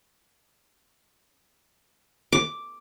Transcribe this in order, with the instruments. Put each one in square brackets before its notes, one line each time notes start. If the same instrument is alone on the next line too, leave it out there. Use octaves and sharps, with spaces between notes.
[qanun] D6